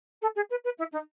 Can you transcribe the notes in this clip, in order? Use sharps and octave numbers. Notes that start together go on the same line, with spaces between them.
A4
G#4
B4
B4
E4
D#4